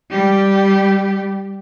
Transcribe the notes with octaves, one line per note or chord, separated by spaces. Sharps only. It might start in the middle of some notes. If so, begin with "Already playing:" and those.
G3 G4